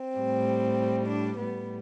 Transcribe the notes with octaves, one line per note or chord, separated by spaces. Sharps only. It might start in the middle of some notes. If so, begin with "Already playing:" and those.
Already playing: C4
A2 G3
D4
A2 G3 B3